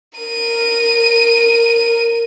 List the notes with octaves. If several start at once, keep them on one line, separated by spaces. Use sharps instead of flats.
A#4 D#7